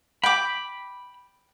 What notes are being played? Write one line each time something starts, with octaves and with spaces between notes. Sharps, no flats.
G5 B5 D6